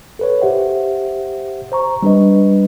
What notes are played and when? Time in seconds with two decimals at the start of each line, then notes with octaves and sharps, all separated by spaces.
0.19 A4 B4 C#5
0.42 G4 C5 E5 F#5
1.72 C5 A#5 C#6
2.03 G3 D4 B4 D#5